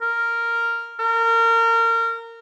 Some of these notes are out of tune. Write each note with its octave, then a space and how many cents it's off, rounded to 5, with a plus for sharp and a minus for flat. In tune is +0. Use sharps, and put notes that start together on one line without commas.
A#4 -5
A#4 -25